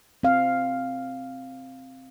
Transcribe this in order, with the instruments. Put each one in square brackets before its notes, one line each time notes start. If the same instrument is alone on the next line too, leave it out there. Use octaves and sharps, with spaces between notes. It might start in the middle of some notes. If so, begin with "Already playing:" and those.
[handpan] C4 F5